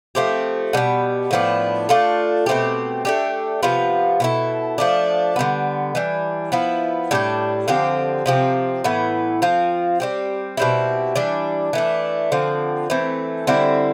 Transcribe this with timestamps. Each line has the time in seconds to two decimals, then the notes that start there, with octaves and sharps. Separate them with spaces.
0.15 F3 A3 C4 G4
0.73 B2 G3 B3
1.31 A2 F3 B3 D4
1.89 A3 D4 F4 A4
2.46 B2 A3 C4 G4
3.05 A3 D4 G4
3.63 C3 F3 B3 F4
4.20 B2 B3 E4 A4
4.78 F3 A3 D4
5.36 D3 G3 B3
5.95 E3 G3 D4
6.52 F3 B3 E4
7.11 A2 G3 D4 A4
7.68 D3 F3 C4 G4
8.26 C3 F3 C4 G4
8.84 A2 E3 B3
9.42 F3 C4 F4
10.00 G3 C4 G4
10.57 B2 G3 C4 E4
11.16 E3 G3 D4
11.73 E3 A3 D4
12.32 D3 F3 C4
12.90 E3 A3 C4
13.47 D3 G3 C4 E4